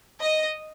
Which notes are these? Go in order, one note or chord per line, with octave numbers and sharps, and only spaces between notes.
D#5